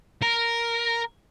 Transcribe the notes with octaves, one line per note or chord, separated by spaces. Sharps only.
A#4